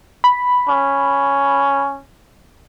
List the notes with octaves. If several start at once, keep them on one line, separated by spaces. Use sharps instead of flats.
B5
C#4